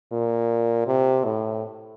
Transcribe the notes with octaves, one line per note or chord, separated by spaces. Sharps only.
A#2
C3
A2